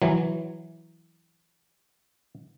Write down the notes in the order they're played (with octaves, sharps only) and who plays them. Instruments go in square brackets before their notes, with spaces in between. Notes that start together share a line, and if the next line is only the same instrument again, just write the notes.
[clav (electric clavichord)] E3 F#3